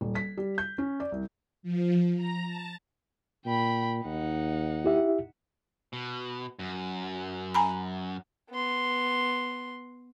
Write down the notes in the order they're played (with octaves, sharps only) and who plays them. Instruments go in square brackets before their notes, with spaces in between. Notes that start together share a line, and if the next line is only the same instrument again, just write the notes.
[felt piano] D#1
B6
G3
G6
C#4
D5
C2
[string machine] F3
A#5
A5
[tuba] A#2 [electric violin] G5 B5
[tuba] D#2 [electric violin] D#4 F#5
[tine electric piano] E4 G4 E5
[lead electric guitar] B2
F#2
[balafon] G#5 A#5 B5
[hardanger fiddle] B3 C6